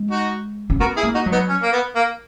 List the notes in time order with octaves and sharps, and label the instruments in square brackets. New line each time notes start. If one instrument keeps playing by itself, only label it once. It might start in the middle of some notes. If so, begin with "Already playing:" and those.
Already playing: [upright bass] G#3
[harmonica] D#4 F#4
[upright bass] C#4
[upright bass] B3 [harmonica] F#4 A#4
[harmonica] E4 G#4
[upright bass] A#3
[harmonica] D#4 F#4
[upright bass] F#3
[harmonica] B3 D#4
C#4
A#3
B3
A#3